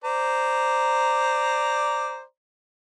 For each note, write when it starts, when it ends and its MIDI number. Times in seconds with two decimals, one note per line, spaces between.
0.04 2.22 72
0.04 2.22 74
0.04 2.22 82